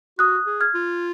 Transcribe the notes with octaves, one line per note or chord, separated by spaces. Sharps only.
F#4 D#6 F#6
G#4
F6 G#6
F4